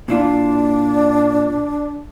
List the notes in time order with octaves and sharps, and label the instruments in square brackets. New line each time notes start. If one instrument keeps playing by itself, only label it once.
[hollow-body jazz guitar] A#2 E4 F4 [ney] D4